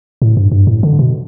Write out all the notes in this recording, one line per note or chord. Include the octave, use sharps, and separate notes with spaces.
A2
G2
G2
A2
D3
B2